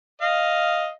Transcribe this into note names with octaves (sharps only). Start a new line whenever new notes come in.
D#5 F5